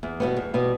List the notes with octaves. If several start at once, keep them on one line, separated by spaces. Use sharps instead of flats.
E2
B2 G3 B3
E2
B2 G3 B3